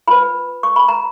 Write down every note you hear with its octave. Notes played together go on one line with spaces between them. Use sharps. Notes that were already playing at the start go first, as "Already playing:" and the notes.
F4 B4 B5
C#6
B5
A#5